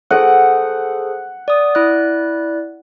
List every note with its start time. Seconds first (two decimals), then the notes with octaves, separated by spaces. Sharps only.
0.11 G#4 A4 C5 F#5
1.48 D5 D#6
1.75 E4 D5 F#6